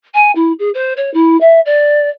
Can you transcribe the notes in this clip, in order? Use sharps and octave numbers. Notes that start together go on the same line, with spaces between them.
G#5
E4
G#4
C5
C#5
E4
E5
D5